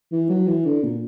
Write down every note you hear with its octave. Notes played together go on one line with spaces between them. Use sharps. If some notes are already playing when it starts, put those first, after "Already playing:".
E3
F#3
E3
D3
A#2